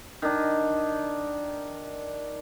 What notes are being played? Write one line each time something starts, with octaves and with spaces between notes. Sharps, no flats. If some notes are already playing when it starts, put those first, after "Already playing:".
D#3 D4